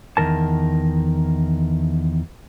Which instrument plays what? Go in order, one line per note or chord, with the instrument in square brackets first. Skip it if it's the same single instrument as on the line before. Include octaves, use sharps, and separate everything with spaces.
[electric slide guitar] E2 G2 D#3 A#4 A5